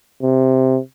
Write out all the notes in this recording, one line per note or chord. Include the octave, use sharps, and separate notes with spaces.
C3